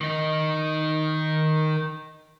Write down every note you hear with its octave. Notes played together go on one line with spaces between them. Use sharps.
D#3 D#4